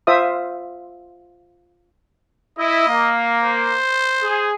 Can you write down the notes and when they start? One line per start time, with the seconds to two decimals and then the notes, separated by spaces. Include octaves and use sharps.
0.07 F4 C5 E5 D#6
2.59 E4 D#5
2.88 A#3
3.43 C5
4.23 G#4